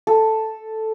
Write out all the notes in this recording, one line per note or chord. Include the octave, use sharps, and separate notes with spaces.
A4